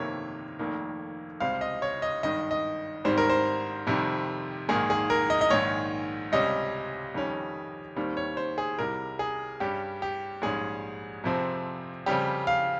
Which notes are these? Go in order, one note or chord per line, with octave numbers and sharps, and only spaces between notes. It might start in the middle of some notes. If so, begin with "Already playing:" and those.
Already playing: G1 F2 C3 D#3 A#3 C#5
F1 F2 D#3 A#3
C#2 C3 G3 C4 F5
D#5
C#5
D#5
G#1 G2 D#3 D#5
D#5
G#1 G#2 D#3 G3 C4 C5
A#4
C5
F2 C3 D#3 G3
A#1 G#2 D#3 A#3 G#4
G#4
A#4
D#5
D#5
A#1 G#2 D#3 C#5
C#2 C3 G3 C#4 D#5
F2 D#3 G3 C#4
D#2 D#3 G3 C4
C#5
C5
G#4
C2 C3 G3 A#4
G#4
G2 G3 C#4 G4
G4
A#1 G#2 G3 C#4 G#4
F2 C3 F3 C4
F2 C#3 G3 C4 G4
F5